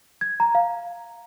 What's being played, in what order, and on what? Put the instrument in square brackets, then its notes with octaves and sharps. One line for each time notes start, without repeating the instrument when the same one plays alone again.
[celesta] G#6
A#5
F5